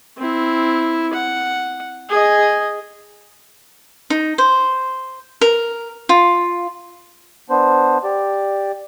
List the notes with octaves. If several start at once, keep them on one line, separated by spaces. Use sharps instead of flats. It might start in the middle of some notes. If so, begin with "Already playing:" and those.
C4 E4
F#5
G#4 D#5
D#4
C5
A#4
F4
B3 D4 C5
G4 D5